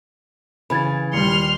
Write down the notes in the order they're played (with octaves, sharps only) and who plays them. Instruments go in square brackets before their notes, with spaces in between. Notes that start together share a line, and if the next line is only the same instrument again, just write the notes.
[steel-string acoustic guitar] C#3 E3 [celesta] B5 G#6 A6
[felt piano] D#1 G3 [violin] C6 F6 [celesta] C#7